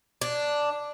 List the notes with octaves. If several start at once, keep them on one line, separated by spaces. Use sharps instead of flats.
D4